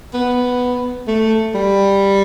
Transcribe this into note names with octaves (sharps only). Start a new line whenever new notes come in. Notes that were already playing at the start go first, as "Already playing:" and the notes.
B3
A3
G3